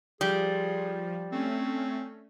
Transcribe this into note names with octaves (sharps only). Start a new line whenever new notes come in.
F3 G3 G#4
A3 C4 C#4